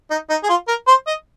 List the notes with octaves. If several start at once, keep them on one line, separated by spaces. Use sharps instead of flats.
D#4
D#4
G#4
F4
A#4
C5
D#5